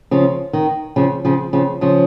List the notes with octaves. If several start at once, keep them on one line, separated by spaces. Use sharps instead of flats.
C#3 F3
D#3
C#3 F3
C#3 F3
C#3 F3
C#3 F3